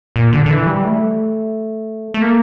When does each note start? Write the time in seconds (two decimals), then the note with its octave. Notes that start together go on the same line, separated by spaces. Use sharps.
0.16 A#2
0.33 D3
0.46 D3
0.51 E3
0.67 G3
0.85 A3
2.14 A3
2.22 A#3